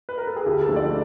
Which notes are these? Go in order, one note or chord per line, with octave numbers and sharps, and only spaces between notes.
B4
A#4
A4
G#4
D2 G4
A4
D3 F3 A3
D5